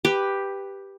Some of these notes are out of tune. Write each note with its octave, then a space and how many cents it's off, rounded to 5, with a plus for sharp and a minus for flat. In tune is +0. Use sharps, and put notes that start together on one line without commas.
G4 +5 B4 +0